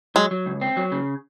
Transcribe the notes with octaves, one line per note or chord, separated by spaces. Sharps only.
F#3 G#3
F#3
C#2
C4
F#3
C#3